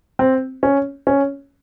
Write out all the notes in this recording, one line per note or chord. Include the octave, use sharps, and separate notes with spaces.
C4
C#4
C#4